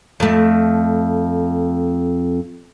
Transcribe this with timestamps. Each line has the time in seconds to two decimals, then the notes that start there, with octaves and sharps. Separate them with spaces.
0.20 F2 A3